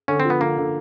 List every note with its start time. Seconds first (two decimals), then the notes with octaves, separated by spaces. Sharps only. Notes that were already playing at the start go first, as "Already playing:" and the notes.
0.08 D3 C#4
0.20 C4
0.25 F3 B3
0.40 D3 A#3
0.58 D3